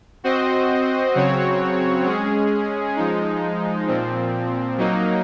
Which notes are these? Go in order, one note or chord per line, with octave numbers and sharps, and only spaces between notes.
C4 F#4 C5 D#5
C#3 F#3 C4 F#4 C#5
G#3 C#4 G#4
F3 G#3 D#4
A#2 F3 C4
F#3 A#3 D#4